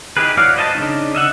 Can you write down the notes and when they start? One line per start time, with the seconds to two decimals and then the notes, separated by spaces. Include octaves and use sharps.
0.17 D#4 E4 G4 G#4 B4
0.37 E4 F#4 C#5 D5 F5
0.56 B4 C5 D#5 G#5 A5
0.75 C#3 A3 D4 D#4
1.15 D#5 E5 F#5